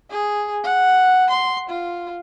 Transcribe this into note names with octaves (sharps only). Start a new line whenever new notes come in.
G#4
F#5
C6
F4